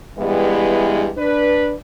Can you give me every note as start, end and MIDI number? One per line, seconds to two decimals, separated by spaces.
0.18 1.10 43
0.18 1.10 52
0.18 1.10 55
0.18 1.10 56
0.18 1.10 59
0.18 1.10 64
1.17 1.73 62
1.17 1.73 71